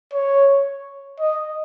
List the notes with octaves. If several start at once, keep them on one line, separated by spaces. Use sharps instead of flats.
C#5
D#5